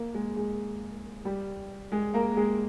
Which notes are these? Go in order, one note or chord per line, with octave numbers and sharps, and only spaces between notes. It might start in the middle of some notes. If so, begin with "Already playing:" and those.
Already playing: A#3 A#4
G#3 G#4
G#3 G#4
G3 G4
G#3 G#4
A#3 A#4
G#3 G#4